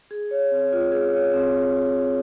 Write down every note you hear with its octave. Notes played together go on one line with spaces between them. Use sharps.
G#4
C#5
C4
F4
G#4
C#5
C4